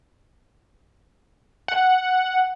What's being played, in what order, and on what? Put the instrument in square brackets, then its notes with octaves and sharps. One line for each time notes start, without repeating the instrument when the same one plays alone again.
[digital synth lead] F#5